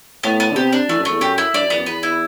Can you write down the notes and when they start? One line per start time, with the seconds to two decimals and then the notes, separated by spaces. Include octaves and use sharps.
0.23 A2 B3
0.40 B3
0.51 D3
0.56 C3 G4
0.73 D4
0.89 E3 A3
1.00 F#2
1.05 E2 A3
1.21 F#2 G4
1.38 E4
1.54 G2 D5
1.63 F#2
1.70 E2 B3
1.78 F#2
1.86 E2 B4
2.03 E4